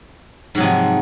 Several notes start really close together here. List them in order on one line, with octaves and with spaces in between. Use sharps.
G#2 F#3 C3 F3